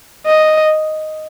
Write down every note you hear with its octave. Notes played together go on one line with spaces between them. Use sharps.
D#5